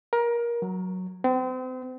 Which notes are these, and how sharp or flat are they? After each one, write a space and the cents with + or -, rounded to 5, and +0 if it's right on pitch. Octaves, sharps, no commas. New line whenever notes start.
A#4 +20
F#3 -5
C4 -35